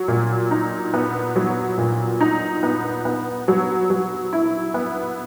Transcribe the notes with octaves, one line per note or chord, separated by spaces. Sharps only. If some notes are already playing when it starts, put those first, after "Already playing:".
Already playing: F#3
A#2
D#4
B3
F#3
A#2
D#4
B3
B3
F#3
F#3
E4
B3